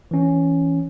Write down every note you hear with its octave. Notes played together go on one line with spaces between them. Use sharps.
E3 C#4